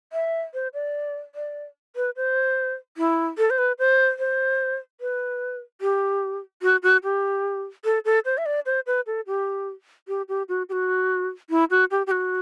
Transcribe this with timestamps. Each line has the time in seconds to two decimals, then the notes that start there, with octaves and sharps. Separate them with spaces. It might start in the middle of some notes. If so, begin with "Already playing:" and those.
0.13 E5
0.54 C5
0.74 D5
1.35 D5
1.96 B4
2.16 C5
2.97 E4
3.38 A4
3.50 C5
3.58 B4
3.79 C5
4.19 C5
5.01 B4
5.81 G4
6.62 F#4
6.83 F#4
7.03 G4
7.85 A4
8.05 A4
8.25 C5
8.38 E5
8.46 D5
8.66 C5
8.86 B4
9.06 A4
9.27 G4
10.08 G4
10.28 G4
10.49 F#4
10.69 G4
10.72 F#4
11.50 E4
11.70 F#4
11.91 G4
12.07 G4
12.11 F#4